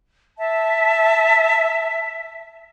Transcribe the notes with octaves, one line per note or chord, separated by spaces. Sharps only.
E5 A5